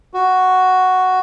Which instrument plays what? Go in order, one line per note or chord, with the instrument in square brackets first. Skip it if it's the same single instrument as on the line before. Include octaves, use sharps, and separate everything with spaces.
[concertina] F#4